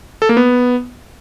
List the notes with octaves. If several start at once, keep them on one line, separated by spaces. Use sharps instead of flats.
A4
A#3
B3